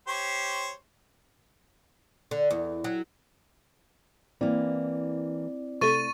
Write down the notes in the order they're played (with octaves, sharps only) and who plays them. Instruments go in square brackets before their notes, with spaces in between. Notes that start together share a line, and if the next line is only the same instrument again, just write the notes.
[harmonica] G4 C5 C#5
[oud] D3
E2
F#3
[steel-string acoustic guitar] E3 A#3 [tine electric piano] C4 E4 D5
[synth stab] C3 A3 [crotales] C#6 A6 D#7